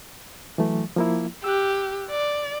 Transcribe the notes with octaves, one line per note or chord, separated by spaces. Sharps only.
E3 F#3 A3
F3 A#3 E4
G4 E6 F#6
D5